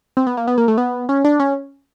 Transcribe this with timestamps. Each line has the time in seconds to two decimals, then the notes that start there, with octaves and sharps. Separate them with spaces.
0.17 C4
0.27 B3
0.37 A#3
0.47 B3
0.58 A#3
0.68 A3
0.78 B3
1.09 C#4
1.24 D4
1.40 C#4